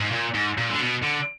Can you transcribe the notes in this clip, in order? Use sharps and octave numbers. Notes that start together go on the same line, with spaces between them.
G#2
A#2
G#2
A#2
D3
B2
D3